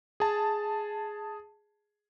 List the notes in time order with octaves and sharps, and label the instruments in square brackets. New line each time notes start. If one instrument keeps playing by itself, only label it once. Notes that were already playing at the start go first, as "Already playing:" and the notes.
[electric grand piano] G#4 A5